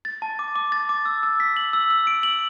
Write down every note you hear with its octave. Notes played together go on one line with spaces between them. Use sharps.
A6
A5
D6
D6
A6
D6
E6
E6
B6
F#7
E6
E6
D7
F#7